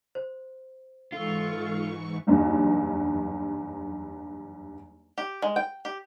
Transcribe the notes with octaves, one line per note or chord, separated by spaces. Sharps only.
C5
G#2 E3 F4 A4 C#6
F#1 B1 E2 G2
G4
G#3
G5
G4